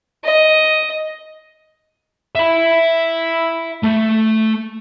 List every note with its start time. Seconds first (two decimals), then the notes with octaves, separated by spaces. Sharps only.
0.25 D#5
2.35 E5 B5
3.84 A3